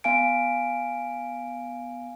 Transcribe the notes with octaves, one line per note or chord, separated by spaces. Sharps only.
B3 F5 G#5 D7